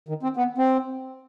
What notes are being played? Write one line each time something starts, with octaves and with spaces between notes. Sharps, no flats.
D#3
C4
B3
C4